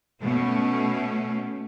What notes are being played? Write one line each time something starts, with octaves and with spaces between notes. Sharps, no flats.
B2 A3 C#4